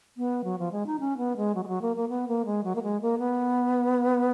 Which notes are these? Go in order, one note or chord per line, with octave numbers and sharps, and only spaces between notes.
B3
F#3
F3
G#3
D#4
C#4
B3
G#3
F#3
G#3
F#3
A#3
A#3
B3
A#3
G#3
F#3
A#3
G#3
A#3
B3